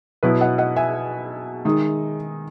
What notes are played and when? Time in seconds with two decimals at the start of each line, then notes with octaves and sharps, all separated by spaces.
0.23 B2 F#3 B3 E4 B4
0.41 D#5 F#5
0.58 D#5 F#5
0.76 E5 G#5
1.65 D#3 G#3 D#4